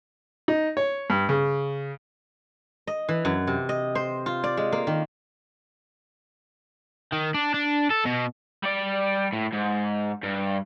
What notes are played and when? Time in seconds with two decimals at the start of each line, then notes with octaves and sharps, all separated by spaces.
0.48 D#4
0.77 C#5
1.10 G2
1.29 C#3
2.87 D#5
3.08 E3
3.25 F#2
3.47 C3
3.69 D#5
3.95 C5
4.26 F4
4.44 D5
4.57 G#3
4.72 A#3
4.87 D#3
7.13 D#3
7.34 D4
7.54 D4
7.91 A4
8.06 B2
8.63 G3 D5
9.33 A2
9.53 G#2
10.23 G2